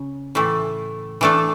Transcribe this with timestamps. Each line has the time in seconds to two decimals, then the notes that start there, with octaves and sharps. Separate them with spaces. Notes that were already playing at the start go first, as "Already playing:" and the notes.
Already playing: C#3
0.35 A2 E3 A3
1.21 E3 A3 D4 A4